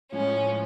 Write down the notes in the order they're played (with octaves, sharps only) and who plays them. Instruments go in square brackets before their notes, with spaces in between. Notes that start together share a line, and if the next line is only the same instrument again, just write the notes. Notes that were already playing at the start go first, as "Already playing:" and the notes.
[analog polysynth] A2 F3 G#3 [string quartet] C#4